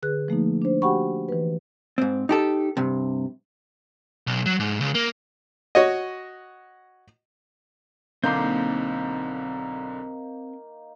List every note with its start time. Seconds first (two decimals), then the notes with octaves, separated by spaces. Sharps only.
0.03 D3 G#4 B4 F#6
0.28 F3 A3 A#3 D#4
0.62 D4 C5
0.82 F#4 G4 F#5 G5 B5 C#6
1.28 E3 B4
1.98 G#2 C4
2.29 D#4 G4 A4
2.77 G2 C3
4.27 B1
4.46 F#3
4.59 G#2
4.80 C#2
4.95 A#3
5.75 F#4 C#5 D#5
8.24 B1 D3 A#3 C4 D#4 C6 G6